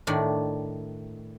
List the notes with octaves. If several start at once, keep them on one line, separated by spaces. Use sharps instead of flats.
A2 D#3 D4